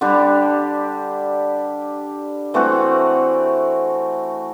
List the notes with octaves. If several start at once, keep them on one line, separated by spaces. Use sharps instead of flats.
D3 G3 D4 G4
E3 A3 C4 F#4